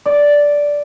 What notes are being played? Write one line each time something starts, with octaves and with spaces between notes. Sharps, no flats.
D5